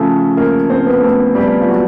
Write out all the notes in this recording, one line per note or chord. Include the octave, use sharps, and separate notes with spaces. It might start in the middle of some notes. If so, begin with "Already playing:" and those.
Already playing: C#3 F3 A3 A4
A#3 A#4
C4 C5
B3 B4
A3 A4
G3 G4
F4
F#3 F#4